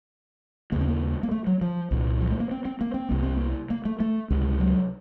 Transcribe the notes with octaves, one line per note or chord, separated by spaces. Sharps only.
D#2 C#3 A#3
C4
A#3
A#3
A3
F#3
F3
C2 A#2
F3
A3
A#3
C4
C4
A#3
C4
C2 C3 A#3
C4
A#3
A#3
A3
A3
C#2 C3
F#3